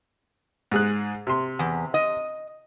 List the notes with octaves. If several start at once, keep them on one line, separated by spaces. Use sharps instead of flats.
G#2 G#4 F#6
C3 C6
E2
D#5